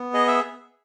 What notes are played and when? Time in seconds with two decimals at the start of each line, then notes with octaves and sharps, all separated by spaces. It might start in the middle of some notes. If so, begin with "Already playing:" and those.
Already playing: B3
0.14 G#4 D#5
0.28 E5